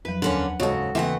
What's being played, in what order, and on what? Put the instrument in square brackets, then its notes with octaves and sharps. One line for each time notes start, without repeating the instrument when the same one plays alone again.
[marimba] F2 F3 F#3 [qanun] B4
[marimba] D#2 D4 [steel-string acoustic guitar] D3 A#3 C#4 [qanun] F#5
[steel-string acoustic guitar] G#2 C#3 [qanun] F#4 A4 [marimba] C#5 D#5
[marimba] C#3 A#3 [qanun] E3 A3 [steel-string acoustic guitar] C4 D#5 F#5